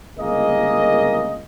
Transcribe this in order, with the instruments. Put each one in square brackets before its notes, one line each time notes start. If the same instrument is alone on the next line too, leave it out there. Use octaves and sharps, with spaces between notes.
[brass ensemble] G1 C#2 A#3 G#4 A#4 D#5